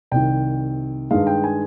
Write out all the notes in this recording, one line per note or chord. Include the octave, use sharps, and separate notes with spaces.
C2 C3 D#3 G5
G2 D#3 G#3 F5
G5
G#5